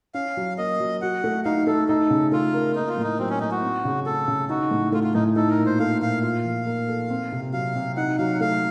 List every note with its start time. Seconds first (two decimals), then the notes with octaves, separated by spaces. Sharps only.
0.14 C#4 F5
0.37 F#3
0.58 A#3 D#5
0.80 F#3
1.01 F#4 F#5
1.24 A3
1.45 D#4 F5
1.67 A3 A4
1.88 D#4 A4
2.10 C#3
2.32 A3 F4
2.53 A#4
2.76 A#3 D#4
2.89 F4
2.98 A2
3.03 D#4
3.19 F#3 C4
3.29 C#4
3.40 A2 D#4
3.51 F#4
3.62 C4
3.85 C#3
4.06 A3 A4
4.28 C#3
4.49 D#4 F#4
4.71 A2
4.92 A3 F4
5.03 F4
5.14 A2 D#4
5.36 D#4 A4
5.50 A#4
5.58 A#2
5.66 C5
5.79 A3 F5
6.01 A#2 F5
6.23 F4 F5
6.45 F3
6.67 A#3
6.88 A4
7.10 C4
7.32 C3
7.53 F#3 F5
7.75 C3
7.97 D#4 F#5
8.18 F#3 F5
8.34 F#5
8.41 A3 F5